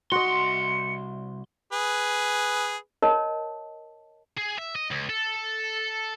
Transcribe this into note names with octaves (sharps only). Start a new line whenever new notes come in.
C2 F#4 D#5 C6 C#7
G#4 B4
A#4 C#5 D#5 A5
G#4
E5
D#5
C#2
A4